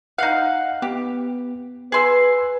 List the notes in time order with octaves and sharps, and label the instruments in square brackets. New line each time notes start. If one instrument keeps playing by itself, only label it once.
[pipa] D#4 F5 [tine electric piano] F#5 F#6
[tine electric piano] B3 [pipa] G4
[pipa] G#4 C6 [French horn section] B4 [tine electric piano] E6 C7